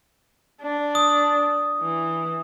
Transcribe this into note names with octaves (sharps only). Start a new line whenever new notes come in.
D4
D#6
E3